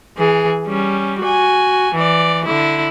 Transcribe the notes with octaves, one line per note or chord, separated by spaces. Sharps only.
E3 G#4
G3 C#4
F#4 G#5
E3 D5
D3 E4